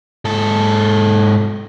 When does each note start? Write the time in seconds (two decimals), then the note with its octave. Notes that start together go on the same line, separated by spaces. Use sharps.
0.25 G#2 A4